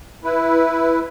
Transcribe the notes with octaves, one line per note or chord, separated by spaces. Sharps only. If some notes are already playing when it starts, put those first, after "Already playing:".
E4 B4